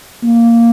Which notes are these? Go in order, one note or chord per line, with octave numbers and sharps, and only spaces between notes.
A#3